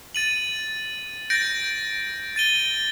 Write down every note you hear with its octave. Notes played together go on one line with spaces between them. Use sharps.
A6 D#7 F#7
G6 A6 A#6 D7
A6 D#7 G7